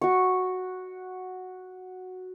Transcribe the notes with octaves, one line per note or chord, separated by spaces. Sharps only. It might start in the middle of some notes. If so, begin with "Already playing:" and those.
F#4 C#6